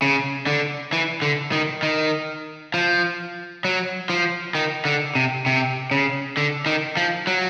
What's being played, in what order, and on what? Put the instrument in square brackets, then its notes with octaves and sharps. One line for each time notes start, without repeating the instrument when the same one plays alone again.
[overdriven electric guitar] C#3
D3
E3
D3
D#3
D#3
F3
F#3
F3
D#3
D3
C3
C3
C#3
D3
D#3
F3
F#3